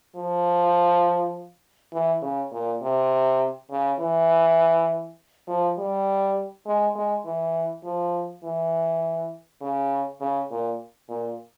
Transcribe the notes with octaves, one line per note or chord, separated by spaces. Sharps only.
F3
E3
C#3
A#2
C3
C#3
E3
F3
G3
G#3
G#3
E3
F3
E3
C#3
C#3
A#2
A#2